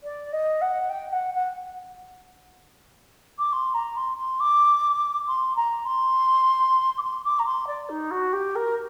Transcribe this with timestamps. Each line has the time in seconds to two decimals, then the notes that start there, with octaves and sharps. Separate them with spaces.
0.04 D5
0.33 D#5
0.62 F#5
0.90 G5
1.13 F#5
1.34 F#5
3.39 D6
3.53 C6
3.74 A#5
3.97 C6
4.18 C6
4.40 D6
5.27 C6
5.56 A#5
5.85 C6
6.98 D6
7.02 C6
7.24 D6
7.39 A#5
7.46 C6
7.67 D5
7.90 D#4
8.11 F#4
8.33 G4
8.56 A#4